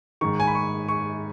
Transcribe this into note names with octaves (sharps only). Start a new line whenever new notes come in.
G#2 D#3 C#6
G#5
B5
C#6
C#6